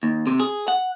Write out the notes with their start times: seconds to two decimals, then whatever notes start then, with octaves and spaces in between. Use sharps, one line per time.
0.03 D#2
0.27 C3
0.40 G#4
0.68 F#5